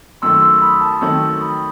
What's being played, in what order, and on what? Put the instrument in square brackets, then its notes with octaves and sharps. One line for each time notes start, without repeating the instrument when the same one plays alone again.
[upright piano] F#2 D#3 A3 [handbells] C6 E6
[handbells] C6 E6
C6
B5 D#6
A5 C6
[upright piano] D#3 F#3 A3 C4 [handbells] C6 E6
[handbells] B5 D#6